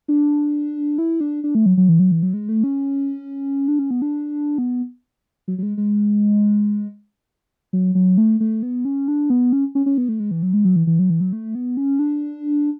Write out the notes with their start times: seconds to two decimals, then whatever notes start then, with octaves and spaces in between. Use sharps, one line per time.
0.08 D4
0.98 E4
1.21 D4
1.44 D4
1.55 A3
1.66 F#3
1.77 F#3
1.89 E3
1.99 F#3
2.12 E3
2.23 F#3
2.34 G#3
2.49 A3
2.64 C#4
3.68 D4
3.79 C#4
3.91 B3
4.02 D4
4.58 B3
5.48 F#3
5.58 F#3
5.63 G#3
5.77 G#3
7.73 F#3
7.95 F#3
8.18 A3
8.40 A3
8.63 B3
8.85 C#4
9.08 D4
9.30 B3
9.53 C#4
9.75 C#4
9.86 C#4
9.98 B3
10.09 A3
10.20 G#3
10.31 E3
10.43 F#3
10.53 G#3
10.65 F#3
10.76 E3
10.87 E3
10.99 F#3
11.10 E3
11.21 F#3
11.33 A3
11.55 B3
11.77 C#4
11.99 D4